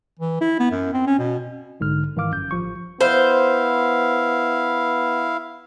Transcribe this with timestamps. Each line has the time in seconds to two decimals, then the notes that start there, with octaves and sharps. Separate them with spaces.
0.19 E3
0.41 E4
0.60 B3
0.71 F#2
0.94 C4
1.07 C#4
1.18 B2
1.80 B1 G#2 D3 F6
2.16 G#2 D#3 E3 F5 D6 F6
2.31 G1 F#2 G6
2.51 A1 F3 C#6
3.01 B3 E4 C5 F5